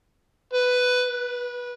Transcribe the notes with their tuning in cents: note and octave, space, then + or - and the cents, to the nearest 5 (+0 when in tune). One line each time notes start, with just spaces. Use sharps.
B4 +10
B4 -20